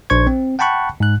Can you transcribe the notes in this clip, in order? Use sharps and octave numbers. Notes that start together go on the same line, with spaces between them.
A#1 D4 C5 C#6 G#6
C4
F#5 G5 A5 B5 C#6 F#6
G#2 F#6